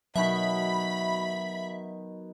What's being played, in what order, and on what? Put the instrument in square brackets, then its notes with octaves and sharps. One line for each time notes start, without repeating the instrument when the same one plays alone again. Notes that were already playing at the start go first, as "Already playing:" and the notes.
[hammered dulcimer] B2 D#3 [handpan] F#3 [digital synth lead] E5 [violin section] B5